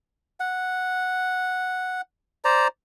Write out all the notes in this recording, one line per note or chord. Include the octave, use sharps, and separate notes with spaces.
F#5
C5 D5 A#5